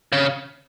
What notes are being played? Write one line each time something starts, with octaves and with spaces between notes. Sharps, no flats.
C#3